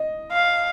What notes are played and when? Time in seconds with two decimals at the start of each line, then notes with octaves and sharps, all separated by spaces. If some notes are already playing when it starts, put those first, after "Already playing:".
Already playing: D#5
0.32 F5